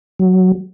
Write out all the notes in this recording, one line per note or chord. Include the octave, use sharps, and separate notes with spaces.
F#3